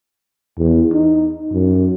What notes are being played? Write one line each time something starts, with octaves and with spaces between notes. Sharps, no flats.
E2
D#4
F#2